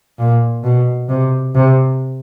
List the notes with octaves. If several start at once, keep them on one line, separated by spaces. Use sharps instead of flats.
A#2
B2
C3
C3